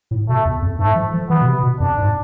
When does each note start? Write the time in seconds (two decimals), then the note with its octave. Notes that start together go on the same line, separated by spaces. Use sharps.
0.11 A2
0.29 B2 A3
0.45 E2
0.62 F2
0.79 G#2 A3
0.95 F3
1.14 F3
1.30 E3 B3
1.41 B2
1.47 C3
1.63 B2
1.80 F2 D4
1.98 G#2